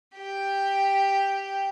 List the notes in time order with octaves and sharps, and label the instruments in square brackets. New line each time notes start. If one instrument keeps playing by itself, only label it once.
[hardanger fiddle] G4 G5